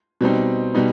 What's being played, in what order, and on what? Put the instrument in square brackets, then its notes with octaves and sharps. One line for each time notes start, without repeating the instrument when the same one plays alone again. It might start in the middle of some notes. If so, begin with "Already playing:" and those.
[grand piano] B2 G3 C4 D#4
B2 G3 B3 D#4